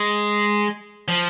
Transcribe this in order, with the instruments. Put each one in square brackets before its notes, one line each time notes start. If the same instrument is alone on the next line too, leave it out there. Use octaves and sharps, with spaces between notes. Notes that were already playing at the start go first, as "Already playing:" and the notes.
Already playing: [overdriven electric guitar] G#3
F3